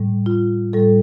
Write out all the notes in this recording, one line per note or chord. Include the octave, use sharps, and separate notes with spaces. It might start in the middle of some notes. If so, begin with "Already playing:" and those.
Already playing: A2 G3
F4
A2 G3 A4